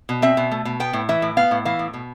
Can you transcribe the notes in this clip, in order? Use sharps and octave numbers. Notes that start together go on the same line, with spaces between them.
B2
C4 E5
B2
A3
B2
B3 G5
A2
E3 E5
A2
B3 F5
A2
E3 F5
A2
B2